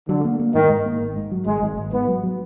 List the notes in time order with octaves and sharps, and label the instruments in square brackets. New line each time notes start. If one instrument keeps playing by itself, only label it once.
[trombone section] D3 [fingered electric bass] F#3
[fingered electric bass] A#3
A#3
[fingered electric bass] G#2 [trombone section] D#3
[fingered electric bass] G#2
A#3
G#1
G#2
F#3
[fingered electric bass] G#1 [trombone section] G#3
[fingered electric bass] G#1
G#1
[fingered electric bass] G#2 [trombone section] B3
[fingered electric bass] F#3
F#3